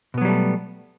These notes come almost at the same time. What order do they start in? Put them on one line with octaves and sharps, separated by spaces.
B2 B3 F#3 G3 A3